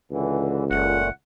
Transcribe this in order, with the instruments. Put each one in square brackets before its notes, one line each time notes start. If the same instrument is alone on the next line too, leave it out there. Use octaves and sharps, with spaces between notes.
[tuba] C#2 [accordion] D3 E3
[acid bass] F#1 [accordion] A#2 A3 [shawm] F#5